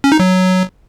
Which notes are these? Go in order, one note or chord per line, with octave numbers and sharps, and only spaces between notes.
C#4
D#4
F#3